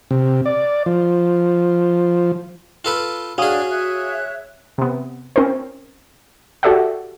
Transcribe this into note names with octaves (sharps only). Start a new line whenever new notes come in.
C3
D5
F3
F4 A4 B4
C#4 D4 F#4 G#4 F5 D#6
C#5 E5 F#6
C3 B3
C4 C#4 A#4 C5
F#4 G4 A4 D5 E5 F#5